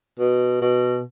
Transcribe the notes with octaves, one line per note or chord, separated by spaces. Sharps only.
B2
B2